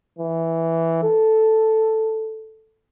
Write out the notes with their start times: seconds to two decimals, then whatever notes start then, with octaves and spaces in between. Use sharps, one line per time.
0.19 E3
1.03 A4